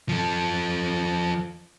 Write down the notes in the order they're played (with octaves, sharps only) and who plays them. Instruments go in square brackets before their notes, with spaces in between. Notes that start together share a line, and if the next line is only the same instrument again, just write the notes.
[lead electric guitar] F3 A4